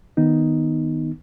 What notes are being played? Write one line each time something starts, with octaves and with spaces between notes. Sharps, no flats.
D#3 B3 D#4